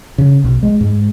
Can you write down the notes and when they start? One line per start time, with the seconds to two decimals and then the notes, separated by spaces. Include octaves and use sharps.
0.18 C#3
0.44 B1
0.63 G#3
0.81 G#2